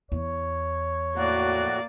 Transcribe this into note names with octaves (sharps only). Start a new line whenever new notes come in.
E2 C#5
A2 A#3 F#4 D5